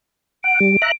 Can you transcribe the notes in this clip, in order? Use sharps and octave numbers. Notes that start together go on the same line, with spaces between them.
F#5 D7
G3
E5 A#5 F#6